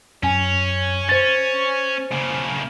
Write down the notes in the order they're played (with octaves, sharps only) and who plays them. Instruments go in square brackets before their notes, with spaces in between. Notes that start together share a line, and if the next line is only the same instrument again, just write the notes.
[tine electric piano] F#2 G#5 [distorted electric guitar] C#4
[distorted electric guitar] C#4 [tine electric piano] C5 A6
[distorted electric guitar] C#3 A#3